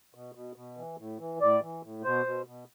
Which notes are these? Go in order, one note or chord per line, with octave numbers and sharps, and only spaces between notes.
B2
B2
B2
E3
A2
E3
A2 D5
E3
A2
B2 C5
B2
B2